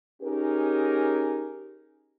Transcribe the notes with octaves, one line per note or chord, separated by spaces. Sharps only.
C#4 D#4 G4 G#4 A#4